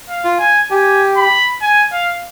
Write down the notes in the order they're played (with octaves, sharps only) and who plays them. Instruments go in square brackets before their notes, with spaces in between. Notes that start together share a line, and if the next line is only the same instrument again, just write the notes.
[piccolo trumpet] F5
[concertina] F4
[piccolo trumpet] G#5
[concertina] G4 [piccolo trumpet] G#5
[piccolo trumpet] B5
G#5
F5